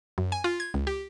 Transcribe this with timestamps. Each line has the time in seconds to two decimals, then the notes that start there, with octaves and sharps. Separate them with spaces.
0.18 F#2
0.32 G#5
0.44 F4
0.60 G#6
0.74 C#2
0.87 G4